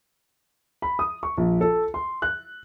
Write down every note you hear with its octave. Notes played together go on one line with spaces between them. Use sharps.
B5
D#6
C#6
A#1
A4
C6
F#6